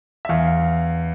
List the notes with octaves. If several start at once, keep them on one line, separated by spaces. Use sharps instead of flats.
E5
E2 F5
F5